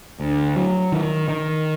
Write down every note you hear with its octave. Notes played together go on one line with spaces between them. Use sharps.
D2
F#3
D#3
D#3